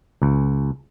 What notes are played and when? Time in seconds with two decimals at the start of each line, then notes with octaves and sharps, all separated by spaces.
0.22 C#2